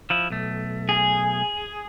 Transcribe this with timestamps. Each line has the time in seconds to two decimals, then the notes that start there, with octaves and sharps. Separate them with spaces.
0.10 F3 E4
0.30 B1 A3
0.89 G#4